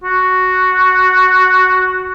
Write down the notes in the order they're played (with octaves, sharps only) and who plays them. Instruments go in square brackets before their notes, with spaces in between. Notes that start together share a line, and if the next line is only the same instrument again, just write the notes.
[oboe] F#4